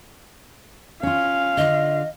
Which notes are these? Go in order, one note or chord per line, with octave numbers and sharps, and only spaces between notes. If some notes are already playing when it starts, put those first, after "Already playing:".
C#4 F4 F5
D3 F4 D#5